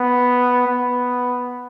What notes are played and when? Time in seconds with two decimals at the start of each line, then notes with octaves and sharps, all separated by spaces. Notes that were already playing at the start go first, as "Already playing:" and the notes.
Already playing: B3
0.67 B3